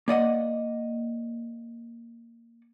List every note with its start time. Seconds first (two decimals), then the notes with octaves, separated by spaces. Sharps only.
0.08 A#3 D5 D#5 F#5